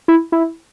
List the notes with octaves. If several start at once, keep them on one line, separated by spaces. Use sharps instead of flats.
E4
E4